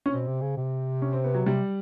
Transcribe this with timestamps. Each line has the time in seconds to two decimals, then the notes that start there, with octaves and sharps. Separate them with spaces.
0.06 C#4
0.13 B2 C4
0.27 C3
0.42 C#3
0.57 C3
1.02 C#4
1.13 C4
1.24 B3
1.35 F#3
1.46 C3 G3